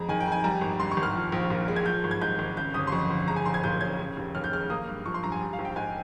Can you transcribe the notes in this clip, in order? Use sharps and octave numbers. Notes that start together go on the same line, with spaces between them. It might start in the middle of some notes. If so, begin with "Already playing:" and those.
Already playing: F2 G#3 A#5
D#3 G#5
G5
F2
G#5
G3 A#5
G#1
G2 C6
C#6
G#1
F6
F3
A#1
A#2
G#3
G#6
F3 G6
G#1
G#6
G#2 G6
G#1
C#3 G6
G1 D#6
C6
F2 C#6
G1
G#3 A#5
G#5
A#1 C6
G#6
A#2 G6
C#4 G#6
C#3
F1
D#2 F6
G6
G#3 F6
A#3 D#6
G2
F3 C#6
C6
G2 A#5
G#5
G3
F5
A#1
G5
G#2 G#5